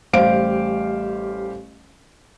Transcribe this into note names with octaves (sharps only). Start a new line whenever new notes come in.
A1 G3 G4 C5 F5 D7